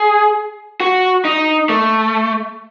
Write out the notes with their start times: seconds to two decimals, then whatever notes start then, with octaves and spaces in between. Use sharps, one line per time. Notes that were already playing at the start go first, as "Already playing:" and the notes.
Already playing: G#4
0.80 F#4
1.25 D#4
1.69 A3